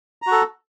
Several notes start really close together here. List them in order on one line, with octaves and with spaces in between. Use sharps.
A#5 F#4 A4